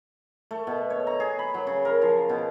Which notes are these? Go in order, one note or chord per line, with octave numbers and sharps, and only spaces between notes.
A3
B2
C#5
A#5
G#4
B5
F#3
C#3
A#4
F3
B2